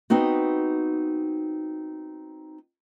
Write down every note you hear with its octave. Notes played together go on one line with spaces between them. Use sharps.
B3 C4 D#4 F#4